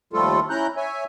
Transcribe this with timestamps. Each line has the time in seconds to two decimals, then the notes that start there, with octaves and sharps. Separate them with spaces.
0.13 D#2 F3 G3 A3 F4 A4
0.50 C#4 E4 A#5 F#6 G6
0.77 C#5 E5 G#5